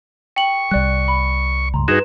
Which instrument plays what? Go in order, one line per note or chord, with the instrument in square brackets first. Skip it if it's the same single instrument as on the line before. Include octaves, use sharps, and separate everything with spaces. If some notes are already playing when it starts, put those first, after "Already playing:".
[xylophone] G5 F#7 [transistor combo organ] C#6
[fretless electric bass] C2 G3 [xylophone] D5 F#6
[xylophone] B5
[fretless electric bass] C#2 G2 [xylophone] A#5 C6
[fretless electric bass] G2 [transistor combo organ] D#4 F#4 G#4 [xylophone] B4 E7